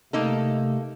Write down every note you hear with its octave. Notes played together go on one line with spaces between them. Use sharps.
C3 A3 A#3 D#4 A4